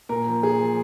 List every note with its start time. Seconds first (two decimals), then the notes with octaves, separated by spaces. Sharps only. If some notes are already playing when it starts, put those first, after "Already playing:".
0.09 A#2 A#4
0.27 F3
0.43 A#2 G#4
0.60 F3